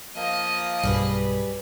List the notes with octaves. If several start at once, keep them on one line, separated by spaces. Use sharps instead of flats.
F3 A#3 D#5
B1 G2 G3 G#4 B4